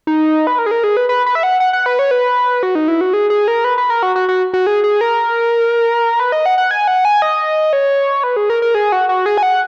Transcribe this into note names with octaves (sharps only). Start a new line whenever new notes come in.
D#4
B4
A#4
G#4
A#4
G#4
B4
B4
B4
E5
F#5
F#5
F#5
B4
C#5
B4
F#4
D#4
E4
F#4
G#4
G#4
A#4
B4
B4
A#4
F#4
F#4
F#4
F#4
G#4
G#4
A#4
B4
D#5
F#5
F#5
G#5
F#5
G#5
D#5
C#5
B4
G#4
A#4
A#4
G#4
F#4
F#4
G#4
G#5
F#5